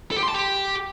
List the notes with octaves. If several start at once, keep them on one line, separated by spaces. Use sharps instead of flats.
A4
G4
C6
A5
G4